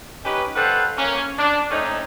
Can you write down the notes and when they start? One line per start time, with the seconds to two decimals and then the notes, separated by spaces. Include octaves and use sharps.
0.25 C#4 D#4 G4 B4
0.55 G3 A4 B4 C5 F5 F#5
0.97 A#3 C#4
1.39 D4
1.71 A3 C4 C#4 D#4